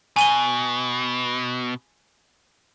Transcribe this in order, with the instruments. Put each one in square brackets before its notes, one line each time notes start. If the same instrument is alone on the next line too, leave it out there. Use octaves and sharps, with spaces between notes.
[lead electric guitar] B2 [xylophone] G#5 D#7 G7